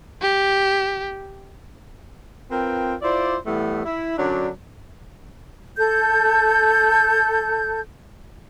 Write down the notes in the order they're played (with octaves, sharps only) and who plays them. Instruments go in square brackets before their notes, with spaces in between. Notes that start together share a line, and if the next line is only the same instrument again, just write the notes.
[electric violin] G4
[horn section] C4 F4 A#4 B4 G5
E4 F4 C5 D5
A2 E3 G3 A3 B3
E4
F#2 D3 F#3 D4
[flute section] A4 G6